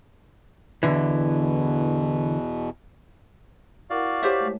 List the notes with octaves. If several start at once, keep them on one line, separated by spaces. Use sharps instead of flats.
E2 B2 D3 E3
E4 F#4 A#4 D5 F5 F#5
G4 C5 C#5 E5
G#3 A3